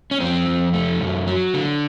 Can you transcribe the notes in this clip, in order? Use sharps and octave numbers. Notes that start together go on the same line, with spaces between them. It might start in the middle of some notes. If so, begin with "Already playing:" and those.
C#4
F2 C4
F2
A3
F#2
F#3
D3